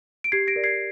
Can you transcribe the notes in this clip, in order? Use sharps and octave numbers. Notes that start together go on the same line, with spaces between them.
D7
G4 G#6 C7
A#6 D7
A#4 D5
G#6 C7